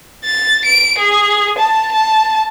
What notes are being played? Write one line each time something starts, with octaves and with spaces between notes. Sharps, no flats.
A6
D7
G#4
A5
A5